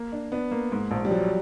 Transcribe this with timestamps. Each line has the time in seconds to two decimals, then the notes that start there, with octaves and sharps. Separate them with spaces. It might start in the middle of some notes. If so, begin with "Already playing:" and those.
Already playing: A#3
0.12 D4
0.32 B3 D4
0.51 A#3
0.72 G#2
0.91 A#1
1.05 G3
1.10 F3 F#3